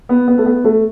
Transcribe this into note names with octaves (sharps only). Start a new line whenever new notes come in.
B3
B3
A3
B3
A3